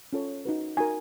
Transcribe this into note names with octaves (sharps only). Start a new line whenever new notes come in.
C#4 F4 A4 C#5
D#4 F#4 B4
D#4 F#4 A#4 G#5